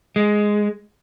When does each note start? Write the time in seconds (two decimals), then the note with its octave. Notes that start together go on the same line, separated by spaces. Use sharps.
0.16 G#3